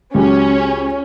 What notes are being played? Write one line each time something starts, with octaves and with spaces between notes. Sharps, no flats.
C#2 F#3 C#4 G4